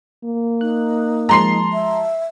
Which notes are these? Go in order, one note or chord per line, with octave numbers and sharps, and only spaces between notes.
A#3
D#4 F#6
F3 G#3 A5 A#5 C6 C7
E5